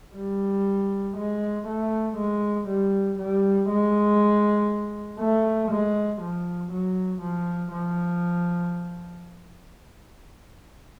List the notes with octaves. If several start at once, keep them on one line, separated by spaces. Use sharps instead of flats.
G3
G#3
A3
G#3
G3
G3
G#3
A3
G#3
F3
F#3
F3
F3